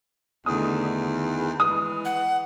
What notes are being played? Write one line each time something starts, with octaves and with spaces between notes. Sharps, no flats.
E2 D3 D#3 A3 D#6
D#3
E3 G#3 D#6
F#5